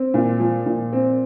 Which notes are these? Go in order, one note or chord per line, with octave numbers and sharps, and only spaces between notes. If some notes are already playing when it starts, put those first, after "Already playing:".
Already playing: C4
A#2
F3
A#2
C4